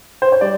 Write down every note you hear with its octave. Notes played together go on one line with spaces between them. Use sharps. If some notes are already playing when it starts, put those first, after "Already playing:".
C5
C#5
G3 D5